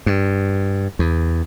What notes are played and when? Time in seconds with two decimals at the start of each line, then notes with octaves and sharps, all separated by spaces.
0.06 G2
0.99 E2